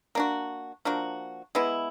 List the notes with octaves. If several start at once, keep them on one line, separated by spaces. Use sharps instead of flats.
A#3 D4 F#4
F3 A#3 D4 F#4
G#3 B3 E4